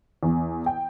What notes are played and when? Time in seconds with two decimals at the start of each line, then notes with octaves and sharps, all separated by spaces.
0.23 E2
0.66 G5